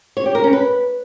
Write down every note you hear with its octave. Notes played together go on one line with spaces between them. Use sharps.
C#5
G4
A#4
C#4
B4